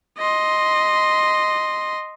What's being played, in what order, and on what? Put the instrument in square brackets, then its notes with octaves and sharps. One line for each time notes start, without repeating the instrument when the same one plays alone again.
[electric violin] D#5 C6